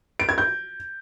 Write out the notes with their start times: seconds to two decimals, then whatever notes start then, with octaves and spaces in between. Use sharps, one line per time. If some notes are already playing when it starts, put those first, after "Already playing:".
0.20 D7
0.29 G#6
0.38 G6